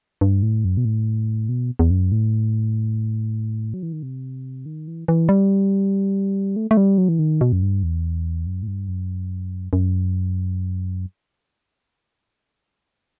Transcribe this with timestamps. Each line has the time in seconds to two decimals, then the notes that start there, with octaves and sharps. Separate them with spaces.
0.21 G2
0.42 A2
0.65 F#2
0.77 B2
0.85 A2
1.49 B2
1.79 E2
1.90 F#2
2.12 A2
3.74 F#3
3.83 E3
3.93 D#3
4.03 C3
4.66 D#3
4.88 E3
5.08 E3
5.29 G3
6.56 A3
6.71 A3
6.77 G3
6.98 F#3
7.09 E3
7.19 D#3
7.41 B2
7.52 F#2
7.62 G2
7.83 E2
8.46 F#2
8.62 A2
8.68 G2
8.88 F#2
9.73 F#2